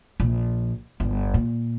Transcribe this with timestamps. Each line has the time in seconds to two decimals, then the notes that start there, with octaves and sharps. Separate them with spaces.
0.20 A#1
1.00 G1
1.34 A#2